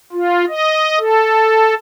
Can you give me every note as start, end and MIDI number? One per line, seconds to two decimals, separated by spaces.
0.12 0.45 65
0.48 0.99 75
0.99 1.74 69